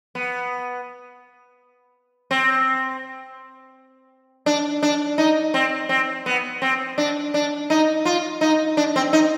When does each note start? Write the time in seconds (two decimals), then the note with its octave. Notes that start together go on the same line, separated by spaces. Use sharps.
0.15 B3
2.31 C4
4.46 D4
4.83 D4
5.18 D#4
5.54 C4
5.89 C4
6.26 B3
6.62 C4
6.98 D4
7.34 D4
7.70 D#4
8.05 F4
8.41 D#4
8.77 D4
8.96 C4
9.13 D#4